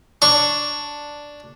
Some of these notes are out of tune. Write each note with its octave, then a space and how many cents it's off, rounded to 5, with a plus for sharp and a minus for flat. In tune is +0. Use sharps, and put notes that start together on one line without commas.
D4 +0 C#6 +0